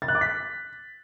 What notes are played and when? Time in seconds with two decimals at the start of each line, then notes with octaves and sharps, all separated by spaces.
0.02 A6
0.08 F#6
0.15 D6
0.21 B6